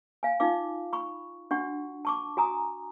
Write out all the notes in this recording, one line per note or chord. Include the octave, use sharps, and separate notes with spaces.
F5 G#5
D#4 F4 F5 D6
B5 C#6
D4 F#4 F#5 C#6
A5 C#6 D6
F#4 G#5 A#5 D#6